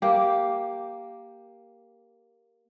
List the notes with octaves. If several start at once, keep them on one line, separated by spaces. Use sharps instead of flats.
A#3 G4